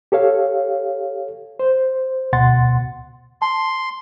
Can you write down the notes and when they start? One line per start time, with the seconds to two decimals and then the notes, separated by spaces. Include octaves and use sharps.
0.12 G4 A4 C#5 F5
1.59 C5
2.33 D2 B2 F#5 C6 A6
3.42 A5 C6